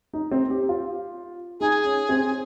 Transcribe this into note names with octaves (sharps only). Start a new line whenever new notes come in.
D#4
C4
G4
F4
D#4 G#4
C#4
C4